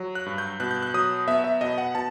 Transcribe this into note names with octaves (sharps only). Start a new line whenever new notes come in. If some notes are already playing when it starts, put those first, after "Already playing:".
Already playing: F#3
F#6
G2
G6
B2 F#6
G6
F#6
F#3 D#6
B3 E5
E5
B2 D#5
F#5
B2 A5